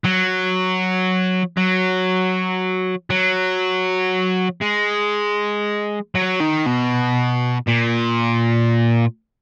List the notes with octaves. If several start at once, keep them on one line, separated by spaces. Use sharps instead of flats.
F#3
F#3
F#3
G#3
F#3
D#3
B2
A#2